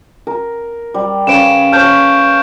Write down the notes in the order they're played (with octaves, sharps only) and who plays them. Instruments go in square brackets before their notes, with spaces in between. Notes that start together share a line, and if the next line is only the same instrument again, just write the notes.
[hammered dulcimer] A#4
G3
[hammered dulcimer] C#3 B4 [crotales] D7 E7
[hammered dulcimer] C#5 A5 [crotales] F6 G6 E7